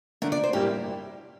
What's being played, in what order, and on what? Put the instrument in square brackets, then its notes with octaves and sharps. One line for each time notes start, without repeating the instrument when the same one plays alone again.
[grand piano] D3 A3 D4 [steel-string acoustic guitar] A#4
[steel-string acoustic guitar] D5
C5
[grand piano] A2 G3 A#3 E4 [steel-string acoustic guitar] G4